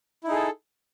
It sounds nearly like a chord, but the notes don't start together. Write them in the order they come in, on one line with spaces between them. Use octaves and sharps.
E4 D#4 G#4 A4